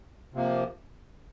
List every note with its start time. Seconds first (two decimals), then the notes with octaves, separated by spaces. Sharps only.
0.34 C3 F3 A#3